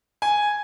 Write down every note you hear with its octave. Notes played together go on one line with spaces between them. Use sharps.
G#5